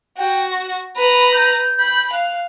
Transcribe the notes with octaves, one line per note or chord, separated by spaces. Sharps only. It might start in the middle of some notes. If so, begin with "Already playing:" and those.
F#4 G5
C#6
B4 A#5 B5
G6
B5
F5 F#6